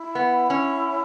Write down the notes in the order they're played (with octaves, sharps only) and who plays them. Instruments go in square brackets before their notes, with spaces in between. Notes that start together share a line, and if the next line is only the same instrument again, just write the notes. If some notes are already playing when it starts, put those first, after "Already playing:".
Already playing: [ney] E4
[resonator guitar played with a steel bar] B3
C#4